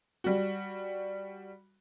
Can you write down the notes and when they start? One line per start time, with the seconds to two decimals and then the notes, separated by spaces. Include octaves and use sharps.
0.24 G3 F#4